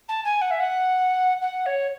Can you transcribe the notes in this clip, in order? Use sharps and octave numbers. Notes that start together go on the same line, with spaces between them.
A5
G#5
F#5
E5
F#5
F#5
C#5